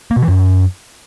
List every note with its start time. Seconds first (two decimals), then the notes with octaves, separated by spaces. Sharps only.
0.11 A#3
0.17 B2
0.22 E3
0.28 F#2